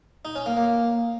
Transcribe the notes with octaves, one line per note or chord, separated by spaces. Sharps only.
D#4
C#4
A#3
A#3